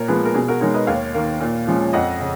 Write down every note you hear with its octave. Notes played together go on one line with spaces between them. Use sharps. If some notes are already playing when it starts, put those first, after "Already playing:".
Already playing: A#2 A#4 C#5
F3 G#3 B3 G#4 B4
A#4
B2 G#4
F#4 A#4
G#3 D#4 A#4 C#5
B4 D#5
D#2 C#5 F5
D#3 A#3
A#2
F3 G#3 C#4
F2 D#5 F#5
C#3